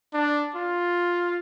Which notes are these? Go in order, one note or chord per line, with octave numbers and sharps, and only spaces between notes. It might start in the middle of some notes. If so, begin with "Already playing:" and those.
D4
F4